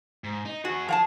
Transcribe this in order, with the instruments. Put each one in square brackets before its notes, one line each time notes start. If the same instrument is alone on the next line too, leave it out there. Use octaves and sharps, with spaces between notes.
[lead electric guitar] G#2
D#4
[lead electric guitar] E2 G#4 [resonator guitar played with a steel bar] F#4
[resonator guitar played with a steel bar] F3 F#5 A5 [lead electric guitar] G#4